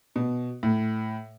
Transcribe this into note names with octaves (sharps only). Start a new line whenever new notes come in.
B2
A2